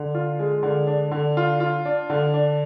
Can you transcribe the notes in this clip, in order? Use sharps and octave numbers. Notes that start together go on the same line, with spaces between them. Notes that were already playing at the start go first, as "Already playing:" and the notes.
Already playing: D3
F4
G#3
D3
D4
D3
F4
F4
D4
D3
D4